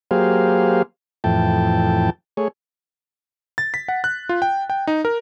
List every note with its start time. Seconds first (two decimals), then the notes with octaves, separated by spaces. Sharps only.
0.11 F#3 A#3 G4 G#4 C5 F5
1.24 F2 A2 E3 G5 A5
2.37 A3 G#4 C#5
3.58 A6
3.74 B6
3.88 F#5
4.04 F#6
4.29 F4
4.42 G5
4.70 G5
4.87 D#4
5.05 A#4